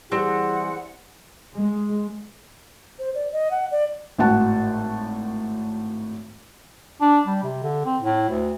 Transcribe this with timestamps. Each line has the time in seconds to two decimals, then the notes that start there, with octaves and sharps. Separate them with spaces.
0.12 E3 G3 C4 E4 G#4 F#5
1.55 G#3
2.99 C5
3.15 D5
3.32 D#5
3.51 F#5
3.71 D5
4.18 G#1 A2 F#4 F#5 A5
7.01 D4
7.27 G3
7.43 C3
7.63 D3
7.86 C4
8.02 A2
8.29 D2